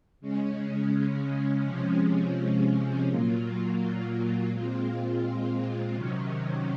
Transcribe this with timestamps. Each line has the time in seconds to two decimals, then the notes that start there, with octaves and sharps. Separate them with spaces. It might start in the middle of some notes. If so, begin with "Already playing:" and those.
0.21 C#3 G#3 C#4
1.64 C3 F3 G#3 C#4
3.07 A#2 F#3 A#3 F4
4.51 A#2 G#3 C4 F4
5.94 C3 D#3 F#3 C#4